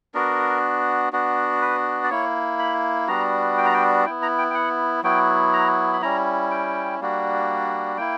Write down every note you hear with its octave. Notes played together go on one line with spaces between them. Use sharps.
B3 D4 F#4 A#4
B3 D4 F#4
B4
D5
A#3 E4 C#5
B5
G3 B3 D4 F#4 A#5
G5
A#5
G5
B3 E4 G5
A#5
G5
G5
F#5
F#3 B3 E4 G5
A#5
B5
G3 C#4 E4 A#5
G5
G3 A#3 D4 F#4
A#3 E4 G5